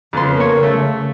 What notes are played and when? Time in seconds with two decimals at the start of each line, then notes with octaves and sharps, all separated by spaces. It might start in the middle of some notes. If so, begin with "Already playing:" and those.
0.13 F2 C#3 B3 C6
0.36 A#3 C#5
0.63 A3